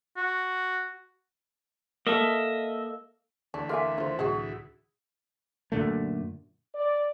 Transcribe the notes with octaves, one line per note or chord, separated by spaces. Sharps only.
F#4
A#3 A4 D#5 E5
D2 E3 D4
A3 A#4 E5 F5 G#5 C6 D6
D3 F4 C5
C2 A2 F#3 E4 F#4 G#4
F#2 A#2 D3 A3
D5